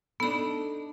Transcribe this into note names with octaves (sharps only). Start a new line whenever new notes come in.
B3 D4 D#4 A4 B5